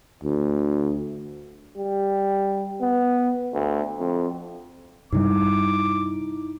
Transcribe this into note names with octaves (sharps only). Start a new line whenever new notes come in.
D2
G3
B3
D2
F2
G2 C3 G3 D#4 E4 D6